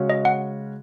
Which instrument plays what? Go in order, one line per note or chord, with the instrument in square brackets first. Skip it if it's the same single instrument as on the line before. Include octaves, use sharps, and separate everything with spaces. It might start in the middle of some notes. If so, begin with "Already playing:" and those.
Already playing: [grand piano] C#3 G#3 C#4 F#4
[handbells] D#5
F#5